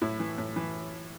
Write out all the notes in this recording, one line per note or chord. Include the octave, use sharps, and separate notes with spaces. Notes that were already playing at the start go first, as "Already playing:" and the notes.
A2 E4
E3
A2
E3